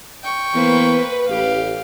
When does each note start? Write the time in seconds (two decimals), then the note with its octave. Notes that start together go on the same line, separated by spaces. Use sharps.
0.23 G5 C#6
0.54 E3 A#3 B3 B4 C5
1.28 A1 G4 F5